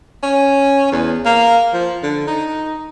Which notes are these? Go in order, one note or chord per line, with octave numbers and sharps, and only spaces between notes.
C#4
E2
A#3
F3
D3
D#4